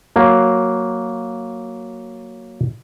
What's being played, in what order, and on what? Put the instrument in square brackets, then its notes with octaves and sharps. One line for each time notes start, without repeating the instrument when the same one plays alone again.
[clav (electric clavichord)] F#3 A#3